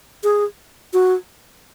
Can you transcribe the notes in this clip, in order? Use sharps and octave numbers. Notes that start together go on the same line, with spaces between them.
G#4
F#4